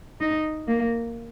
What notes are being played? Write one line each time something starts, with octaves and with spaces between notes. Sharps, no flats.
D#4
A#3